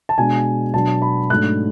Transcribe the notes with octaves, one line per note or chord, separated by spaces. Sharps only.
A5
B2 G#3 D4 G#5
B2 F#3 B3 D4 A5
B5
G#2 F#3 A3 D4 F#6